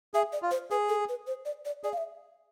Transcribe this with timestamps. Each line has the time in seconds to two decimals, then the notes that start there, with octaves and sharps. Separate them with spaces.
0.14 G#4 E5
0.33 D5
0.42 F4
0.51 C5
0.71 G#4 B4
0.89 A4
1.09 B4
1.27 C5
1.45 D5
1.65 D5
1.84 G#4 D5
1.93 F5
1.98 E5